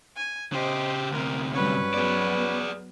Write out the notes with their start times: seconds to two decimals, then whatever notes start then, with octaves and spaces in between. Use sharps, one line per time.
0.16 G#5
0.52 C#3 G4 C5 D#5
1.12 D2 C3 A#4
1.52 G2 F#3 G3 C#4 B4
1.94 F#3 B3 G#4 D5